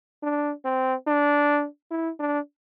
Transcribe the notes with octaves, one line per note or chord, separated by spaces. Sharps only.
D4
C4
D4
E4
D4